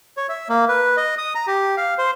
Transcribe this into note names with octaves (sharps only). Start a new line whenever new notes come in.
C#5
E5
A#3
B4
D#5
D#6
A#5
G4
F5
C5